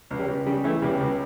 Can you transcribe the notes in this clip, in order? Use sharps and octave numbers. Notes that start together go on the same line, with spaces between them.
C#2
G3
C#2
C#3 G3
E3 A3
C#2 G3
C#2